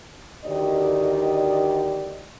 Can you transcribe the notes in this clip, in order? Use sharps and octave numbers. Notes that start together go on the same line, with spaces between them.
D2 D#3 G4 D5 D#5